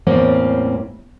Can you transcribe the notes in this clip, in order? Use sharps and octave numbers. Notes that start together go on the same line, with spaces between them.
E2 A2 G3 A#3 C4 C#4